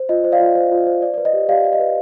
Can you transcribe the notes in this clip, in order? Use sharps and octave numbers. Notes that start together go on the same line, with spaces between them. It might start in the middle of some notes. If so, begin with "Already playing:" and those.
Already playing: C5
F4 D#5
C5
D5 F5
F4
C5
F4
C5
D5
B4 D5
D#5
G4
G4 D5 F5
D5
D#5
B4